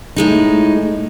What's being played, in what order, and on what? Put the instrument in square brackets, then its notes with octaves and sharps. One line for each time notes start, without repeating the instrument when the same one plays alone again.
[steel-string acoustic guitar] A2 G#3 D#4